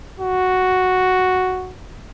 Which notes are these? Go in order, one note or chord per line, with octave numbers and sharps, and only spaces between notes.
F#4